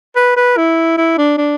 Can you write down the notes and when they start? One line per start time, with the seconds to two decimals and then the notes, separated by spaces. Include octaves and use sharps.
0.16 B4
0.36 B4
0.57 E4
0.97 E4
1.18 D4
1.38 D4